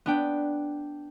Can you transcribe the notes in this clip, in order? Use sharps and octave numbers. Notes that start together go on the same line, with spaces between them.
B3 D4 G5